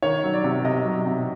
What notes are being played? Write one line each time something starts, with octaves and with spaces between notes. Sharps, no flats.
D#3 C#5
F#3
D5
C3
C3 D#5
F#3
C3